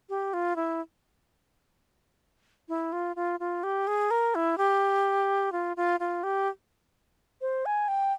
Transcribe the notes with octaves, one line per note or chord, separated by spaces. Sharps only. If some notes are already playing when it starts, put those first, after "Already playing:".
G4
F4
E4
E4
F4
F4
F4
G4
G#4
A#4
E4
G4
F4
F4
F4
G4
C5
G#5
G5